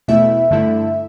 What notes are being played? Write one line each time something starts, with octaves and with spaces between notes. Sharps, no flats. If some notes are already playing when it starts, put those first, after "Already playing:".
E2 B2 A3 E4 E5
G2 D3 A3 E4